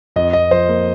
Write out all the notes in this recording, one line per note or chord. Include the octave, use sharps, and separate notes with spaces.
F2 D#5
F2 D#5
F3 C5
A#3